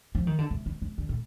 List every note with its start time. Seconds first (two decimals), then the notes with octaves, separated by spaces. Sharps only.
0.15 F3
0.27 D#3
0.38 D3
0.51 C3
0.66 D#3
0.82 D#3
0.98 D3
1.09 A2